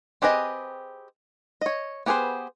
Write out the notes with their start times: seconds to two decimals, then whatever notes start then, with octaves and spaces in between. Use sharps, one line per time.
0.22 C4 G4 G#4 B4 D#5
1.61 C#5 D#5
2.06 B3 G4 G#4 B4 C5